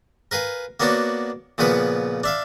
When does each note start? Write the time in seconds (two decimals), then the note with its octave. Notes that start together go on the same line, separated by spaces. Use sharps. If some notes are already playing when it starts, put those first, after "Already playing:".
0.31 A#4 B4 F5 G#5
0.80 A#3 B3 D4 F#4 C#5 D5
1.58 A#2 C#3 F3 B3 B4 C#5
2.24 D4 E5 F5